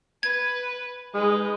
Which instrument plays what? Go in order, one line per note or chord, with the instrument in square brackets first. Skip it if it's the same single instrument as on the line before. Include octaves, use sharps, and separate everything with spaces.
[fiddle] B4 [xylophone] G#6
[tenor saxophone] G#3 [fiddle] D#4 B4